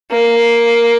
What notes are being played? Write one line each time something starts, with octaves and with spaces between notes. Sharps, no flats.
A#3